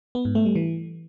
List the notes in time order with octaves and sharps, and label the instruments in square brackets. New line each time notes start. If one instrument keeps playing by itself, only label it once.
[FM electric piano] B3
G#2
A3
G3
E3